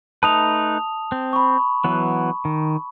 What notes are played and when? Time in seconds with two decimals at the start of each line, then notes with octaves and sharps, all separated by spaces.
0.23 A3 D#4 B4 A5 D#6 F7
1.12 C4
1.33 B5 C#6
1.84 E3 F#3 B3
2.45 D#3